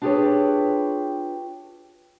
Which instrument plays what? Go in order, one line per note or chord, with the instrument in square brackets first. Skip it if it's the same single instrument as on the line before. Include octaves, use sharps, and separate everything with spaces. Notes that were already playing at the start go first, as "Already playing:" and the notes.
[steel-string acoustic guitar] D4 F4 G4 G#4 B4 C#5